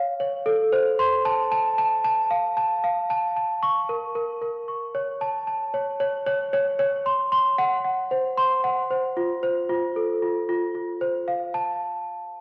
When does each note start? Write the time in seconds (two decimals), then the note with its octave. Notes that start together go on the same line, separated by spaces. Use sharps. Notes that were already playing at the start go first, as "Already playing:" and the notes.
Already playing: C#5 F5
0.20 C#5
0.46 A4
0.72 C5
0.99 C6
1.25 A5
1.52 A5
1.78 A5
2.04 A5
2.31 F5
2.57 A5
2.84 F5
3.10 A5
3.36 A5
3.63 C#6
3.89 A#4
4.15 A#4
4.42 A#4
4.68 C#6
4.95 C#5
5.21 A5
5.47 A5
5.74 C#5
6.00 C#5
6.27 C#5
6.53 C#5
6.79 C#5
7.06 C6
7.32 C6
7.58 F#5
7.84 F#5
8.11 C5
8.37 C6
8.64 F#5
8.91 C5
9.17 F4
9.43 C5
9.69 F4
9.96 A4
10.22 F4
10.49 F4
10.75 F4
11.01 C5
11.28 F5
11.54 A5